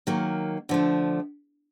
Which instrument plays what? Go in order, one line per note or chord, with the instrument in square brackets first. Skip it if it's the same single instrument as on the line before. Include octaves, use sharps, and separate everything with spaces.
[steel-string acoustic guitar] D#3 F#3 A#3
D3 F3 A3